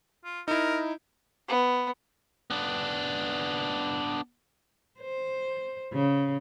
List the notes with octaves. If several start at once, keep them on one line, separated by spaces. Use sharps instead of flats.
F4
D#4 E4 A#4
B3
B3 D4
C5
C#3